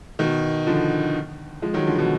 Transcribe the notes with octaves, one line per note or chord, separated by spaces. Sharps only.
B2 D#3
D3 F3
F3 G#3
D#3 F#3
D3 F3
B2 D#3